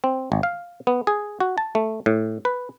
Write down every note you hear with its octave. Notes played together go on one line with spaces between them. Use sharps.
C4
G#1
F5
B3
G#4
F#4
A5
A3
A2
B4